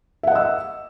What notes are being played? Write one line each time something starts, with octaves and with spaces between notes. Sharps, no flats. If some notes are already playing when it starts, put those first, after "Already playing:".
D#5 E5 F#5 E6